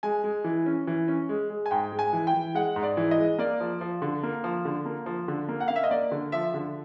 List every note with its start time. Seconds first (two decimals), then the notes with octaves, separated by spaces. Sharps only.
0.03 G#3 G#5
0.24 G#3
0.44 E3
0.66 C#4
0.87 E3
1.08 C#4
1.29 G#3
1.50 G#3
1.66 G#5
1.71 G#2 G5
1.92 G#3
1.99 G#5
2.13 E3
2.27 G5
2.34 E3
2.54 G#3 F#5
2.76 G#2
2.83 D5
2.97 E3
3.11 D#5
3.18 G#3
3.39 A#3 D5
3.60 F3
3.81 F3
4.02 D3
4.23 A#3
4.44 F3
4.65 D3
4.86 A#3
5.06 F3
5.28 D3
5.49 A#3
5.60 F#5
5.68 A#3 F5
5.76 E5
5.84 D#5
5.91 A#3 D5
6.12 D3
6.32 F3 E5
6.54 D3